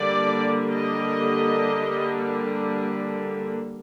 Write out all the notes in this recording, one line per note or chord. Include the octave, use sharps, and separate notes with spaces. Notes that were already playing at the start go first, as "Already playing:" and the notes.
Already playing: D3 G3 A#3 D5
D#5